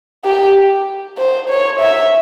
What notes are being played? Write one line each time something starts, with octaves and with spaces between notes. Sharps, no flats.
G4
C5
C#5
E5